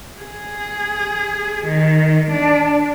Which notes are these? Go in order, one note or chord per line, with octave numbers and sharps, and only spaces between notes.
G#4
D#3
D4